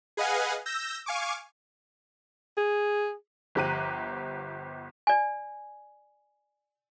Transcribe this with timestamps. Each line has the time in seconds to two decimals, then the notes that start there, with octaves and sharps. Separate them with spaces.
0.17 G#4 B4 D#5 F5 F#5 G#5
0.66 E6 G6 A#6
1.06 F5 G#5 C#6 D6
2.57 G#4
3.55 G1 F3 G4 A#5 F#6 D#7
5.07 D5 G#5